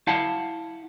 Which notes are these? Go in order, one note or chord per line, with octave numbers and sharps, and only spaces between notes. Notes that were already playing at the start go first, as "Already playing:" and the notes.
E4 F5 F#5 A5